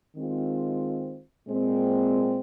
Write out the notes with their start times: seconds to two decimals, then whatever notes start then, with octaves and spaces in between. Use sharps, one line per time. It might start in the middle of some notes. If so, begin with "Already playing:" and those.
0.16 D#3 G#3 C4 F4
1.47 A#2 G#3 C4